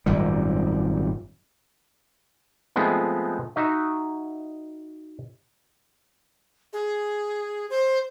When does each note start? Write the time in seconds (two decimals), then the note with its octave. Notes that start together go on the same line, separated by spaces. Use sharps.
0.06 G#1 F#2 A#2 G3
2.76 F3 G#3 A3 B3 C4
3.56 D#4 F#4 E5
6.73 G#4
7.70 C5